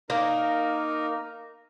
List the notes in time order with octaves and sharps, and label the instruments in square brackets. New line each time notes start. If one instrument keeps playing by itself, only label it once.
[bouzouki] A#3 [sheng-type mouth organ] D#4 A#4